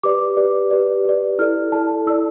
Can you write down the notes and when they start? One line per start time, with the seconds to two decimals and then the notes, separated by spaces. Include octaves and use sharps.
0.03 G4 B4 D5 D6
0.37 G4 B4 D5
0.71 G4 B4 D5
1.05 G4 B4 D5
1.39 E4 A4 D5 F6
1.72 E4 A4 D5 A5
2.07 E4 A4 D5 E6